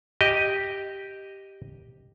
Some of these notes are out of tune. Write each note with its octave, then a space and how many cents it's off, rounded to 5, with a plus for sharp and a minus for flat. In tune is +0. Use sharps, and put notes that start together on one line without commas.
G4 +0 D#5 +0